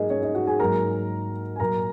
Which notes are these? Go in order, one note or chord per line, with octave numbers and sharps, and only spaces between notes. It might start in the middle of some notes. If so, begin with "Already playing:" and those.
Already playing: G#2 F#3 A#3 D#4 G#4 A#4 D#5
C#4 C#5
D#4 D#5
F#4 F#5
G#4 G#5
G#2 F#3 A#3 A#4 A#5
G#5
A#2 F#3 A#3 A#4 A#5